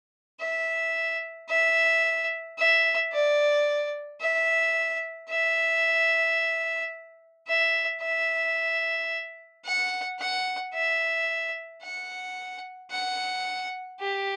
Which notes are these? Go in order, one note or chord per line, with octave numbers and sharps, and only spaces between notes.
E5
E5
E5
D5
E5
E5
E5
E5
F#5
F#5
E5
F#5
F#5
G4